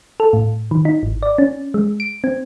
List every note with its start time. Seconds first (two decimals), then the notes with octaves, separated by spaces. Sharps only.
0.20 A4
0.33 A2
0.71 D#3
0.85 D#4
1.03 G#1
1.22 D5
1.38 C#4
1.74 G#3
2.00 D7
2.24 C4